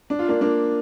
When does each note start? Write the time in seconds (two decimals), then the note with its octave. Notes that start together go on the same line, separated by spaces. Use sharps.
0.10 D4
0.19 F4
0.28 A#3 D4
0.41 A#3 D4